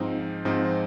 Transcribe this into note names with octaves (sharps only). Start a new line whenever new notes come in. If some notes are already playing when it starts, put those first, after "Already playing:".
Already playing: G#2 F3 C4 D#4
G#2 F3 C4 D#4